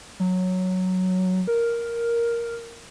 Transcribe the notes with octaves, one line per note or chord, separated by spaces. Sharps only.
F#3
A#4